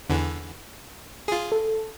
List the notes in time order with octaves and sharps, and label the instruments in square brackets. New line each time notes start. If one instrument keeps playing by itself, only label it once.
[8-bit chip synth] E2 D3 E3
F4 G#4
[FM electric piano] A4